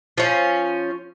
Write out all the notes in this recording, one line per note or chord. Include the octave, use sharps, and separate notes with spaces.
F3 C#4